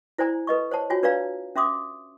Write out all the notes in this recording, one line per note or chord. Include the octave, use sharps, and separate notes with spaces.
E4 C5 D5 G#5 A#5
A4 B4 D#5 C#6
C5 C#5 A5
F4 F#4 C#5 G#5
D4 B4 C#5 D5 F5 A#5
C#4 E5 C6 D6 D#6